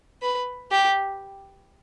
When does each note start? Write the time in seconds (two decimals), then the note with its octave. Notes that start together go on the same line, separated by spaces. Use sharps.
0.22 B4
0.72 G4